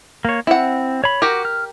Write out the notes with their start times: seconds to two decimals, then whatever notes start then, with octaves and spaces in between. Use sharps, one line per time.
0.25 A#3 C#5
0.47 C4 E4 F#5
1.04 C#5 B5
1.22 F#4 G4 A#4 D6
1.45 F6